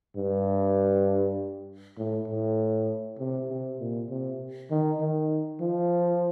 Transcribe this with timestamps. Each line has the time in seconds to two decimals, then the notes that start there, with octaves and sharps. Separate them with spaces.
0.17 G2
1.98 A2
2.28 A2
3.19 C3
3.49 C3
3.80 A#2
4.10 C3
4.71 D#3
5.00 D#3
5.61 F3